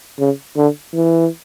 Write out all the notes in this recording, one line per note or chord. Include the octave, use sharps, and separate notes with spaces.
C#3
D3
E3